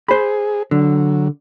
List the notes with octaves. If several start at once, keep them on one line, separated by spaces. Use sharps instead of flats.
G#4 C5 B5
D3 F#3